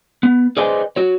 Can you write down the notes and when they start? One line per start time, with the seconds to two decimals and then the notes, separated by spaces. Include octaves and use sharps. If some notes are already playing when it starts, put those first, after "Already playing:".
0.23 B3
0.57 G#4 B4 C5 D5 D#5 G#5
0.96 F#4 C#5